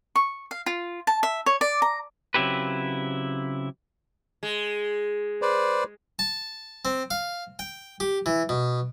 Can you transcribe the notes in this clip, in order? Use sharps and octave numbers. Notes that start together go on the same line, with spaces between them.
C#6
F5
F4
A5
E5
C#5
D5
A#5
C#3 F#3 C4 E4 G4 B4
G#3
B4 C5 D5
A5
C4
F5
G5
G4
E3
B2